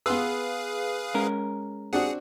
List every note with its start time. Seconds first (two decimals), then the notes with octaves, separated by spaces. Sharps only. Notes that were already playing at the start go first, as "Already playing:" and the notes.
0.06 B3 G#4 B4 F5 C6 E6
1.14 G#3 C#4 A#4
1.93 C4 D4 F#4 G#4 F#5